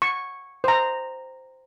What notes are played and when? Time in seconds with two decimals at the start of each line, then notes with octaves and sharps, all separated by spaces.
0.02 C#6
0.64 C5 A#5